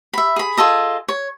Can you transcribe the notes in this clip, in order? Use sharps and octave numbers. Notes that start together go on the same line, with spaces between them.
E5 B5
G#4 B5
F4 G#4 A4 D#5
C#5